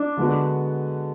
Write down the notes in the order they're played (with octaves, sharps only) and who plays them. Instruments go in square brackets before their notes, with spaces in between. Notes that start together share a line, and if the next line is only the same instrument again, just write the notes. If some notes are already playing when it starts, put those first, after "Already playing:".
Already playing: [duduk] D4
[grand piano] D3 G#3 B3 F#4